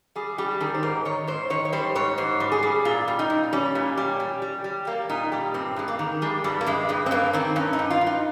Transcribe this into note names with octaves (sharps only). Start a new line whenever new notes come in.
G3 G#4
G3 G4
D#3 G#4
C5
G#2 A#4
D#3 C#5
G#2 C5
D#3 C#5
C#5
G3 C5
G#2 C#5
G#2 C5
G3
G#4
G3
A#2 F4
G3
D#4
A#2
G3 C#4
A#2
G3
G3
G3
G3
G3 A#3
A#2 D#4
G3 G4
G2 C4
G2 G#3
A#3
D#3
G3 G#3
G2 G3
A#3
G2 G#3
G2 G#3
C4
G2 A#3
D#3 C4
G2 C#4
D#4
G2
F4
G2
D#4